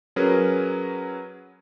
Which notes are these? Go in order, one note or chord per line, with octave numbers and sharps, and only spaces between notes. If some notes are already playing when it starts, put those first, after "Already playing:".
F#3 C#4 G#4 A#4 B4